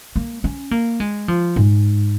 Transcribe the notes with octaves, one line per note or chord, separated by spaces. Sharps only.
A#3
C#4
A#3
G#3
F3
G#2